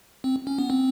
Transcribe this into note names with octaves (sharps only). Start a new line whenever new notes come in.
C4
C#4
B3
C4